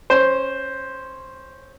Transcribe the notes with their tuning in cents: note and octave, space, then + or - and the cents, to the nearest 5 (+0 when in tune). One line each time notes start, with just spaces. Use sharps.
C#4 -15 C5 +0